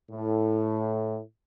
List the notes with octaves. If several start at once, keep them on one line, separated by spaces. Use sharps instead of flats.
A2